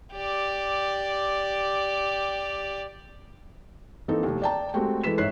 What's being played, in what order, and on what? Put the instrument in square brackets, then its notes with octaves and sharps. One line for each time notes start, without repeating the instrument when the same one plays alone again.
[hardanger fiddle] G4 D5
[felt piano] E3 A#3 C4 D#4 A4
F1 D#2
D5 G5 A5
G#3 A3 C4 F#4 G4 G5
E3 G#3 A4 B4 B6 E7
G#2 C#5 E5 F#6 C7